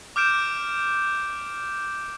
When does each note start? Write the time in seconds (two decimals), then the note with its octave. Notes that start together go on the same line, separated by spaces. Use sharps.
0.16 D6 F6 G6 D7 E7